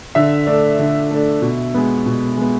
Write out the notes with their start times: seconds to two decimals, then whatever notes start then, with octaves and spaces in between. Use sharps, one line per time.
0.15 D3 E5
0.47 A3 D4
0.79 D3
1.11 A3 D4
1.42 B2
1.74 G#3 B3
2.06 B2
2.37 G#3 B3